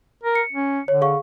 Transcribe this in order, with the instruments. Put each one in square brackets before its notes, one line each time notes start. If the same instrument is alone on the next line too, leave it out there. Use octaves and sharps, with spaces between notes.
[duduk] A#4
[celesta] C#7
[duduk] C#4
[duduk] D3 [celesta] C#5
[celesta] G#4 F5 C#6